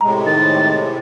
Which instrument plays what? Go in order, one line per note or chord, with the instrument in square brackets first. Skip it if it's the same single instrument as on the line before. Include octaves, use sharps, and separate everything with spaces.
[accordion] A2 C3 G#3 [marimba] A#5
[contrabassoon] D#3 [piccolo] A6